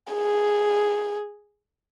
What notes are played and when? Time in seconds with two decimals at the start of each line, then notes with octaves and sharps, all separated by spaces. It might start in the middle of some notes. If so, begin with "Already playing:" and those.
0.13 G#4